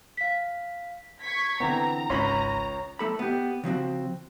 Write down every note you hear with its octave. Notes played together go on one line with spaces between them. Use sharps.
F5 B6
C#6 G#6 B6
D3 E3 B3 C4 A#5
G#1 C#2 C#4 B5 C6
A3 A4 B5
B3 G4
C#3 F3 C4 F#4